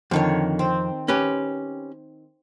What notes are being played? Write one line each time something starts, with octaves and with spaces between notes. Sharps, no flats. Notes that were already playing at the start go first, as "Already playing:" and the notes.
F2 D3 D#3 C#5
C4
C#4 G4 B4